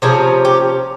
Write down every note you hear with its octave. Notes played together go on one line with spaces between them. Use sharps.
C3 F3 A#3 C#4 G#4
G4